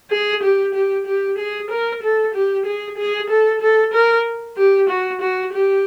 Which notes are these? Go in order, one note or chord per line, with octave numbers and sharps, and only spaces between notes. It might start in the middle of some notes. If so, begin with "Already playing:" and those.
G#4
G4
G4
G4
G#4
A#4
A4
G4
G#4
G#4
A4
A4
A#4
G4
F#4
F#4
G4